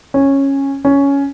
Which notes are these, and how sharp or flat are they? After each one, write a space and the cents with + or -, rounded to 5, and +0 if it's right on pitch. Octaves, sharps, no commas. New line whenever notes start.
C#4 -10
C#4 +10